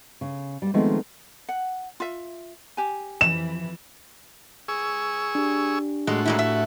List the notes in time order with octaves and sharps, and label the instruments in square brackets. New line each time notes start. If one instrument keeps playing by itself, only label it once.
[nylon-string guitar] C#3
G3 A#3
D#3 F3 G#3 A3 B3 C4
[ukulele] F#5
F4 E5
G4 G#5
[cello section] F2 E3 [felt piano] E7
[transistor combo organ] G#4 C#6 E6
[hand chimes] D4 G4
[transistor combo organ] A2 F#4 [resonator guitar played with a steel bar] G#3
[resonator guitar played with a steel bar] A#2 G#3 E4
E5